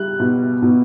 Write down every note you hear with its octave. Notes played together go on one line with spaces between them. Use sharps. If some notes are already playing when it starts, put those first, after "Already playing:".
Already playing: G3 F#6
B2
B2